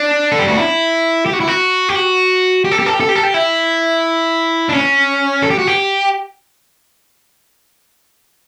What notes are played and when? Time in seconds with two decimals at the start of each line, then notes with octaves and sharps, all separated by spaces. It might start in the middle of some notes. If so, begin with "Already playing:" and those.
Already playing: D4
0.32 A4
0.39 G4
0.48 F#4
0.56 E4
1.26 G4
1.33 F#4
1.40 E4
1.48 F#4
1.89 G4
1.95 F#4
2.65 G4
2.71 A4
2.79 G4
2.86 A4
2.93 G4
3.00 A4
3.09 G4
3.15 A4
3.23 G4
3.34 E4
4.69 D4
4.73 C#4
5.43 A4
5.50 G4
5.59 F#4
5.67 G4